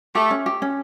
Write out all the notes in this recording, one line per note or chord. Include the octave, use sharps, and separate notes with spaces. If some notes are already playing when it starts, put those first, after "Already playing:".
A3 G4
C#4
G4
C#4